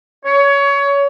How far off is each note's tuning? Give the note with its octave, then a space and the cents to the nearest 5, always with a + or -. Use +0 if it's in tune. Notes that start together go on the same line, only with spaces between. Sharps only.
C#5 +20